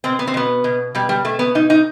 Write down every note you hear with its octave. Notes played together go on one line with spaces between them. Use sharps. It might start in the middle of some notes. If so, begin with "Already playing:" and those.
B2 C4
B3
C4
B2 B3
B2
B2 G3
G3
B2 A3
B3
B2 D#4
D#4